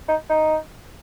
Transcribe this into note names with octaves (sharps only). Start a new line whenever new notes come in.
D#4
D#4